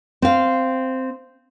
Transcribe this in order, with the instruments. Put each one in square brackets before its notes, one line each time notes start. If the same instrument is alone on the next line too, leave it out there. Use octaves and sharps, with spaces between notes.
[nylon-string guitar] C4 F5